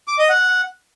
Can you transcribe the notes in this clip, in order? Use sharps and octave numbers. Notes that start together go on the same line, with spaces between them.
D6
D#5
F#5